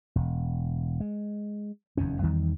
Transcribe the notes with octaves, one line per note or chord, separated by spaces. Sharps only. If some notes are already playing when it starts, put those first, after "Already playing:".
E1
G#3
F1 E2 D#3 C#4
E2 D#3 G3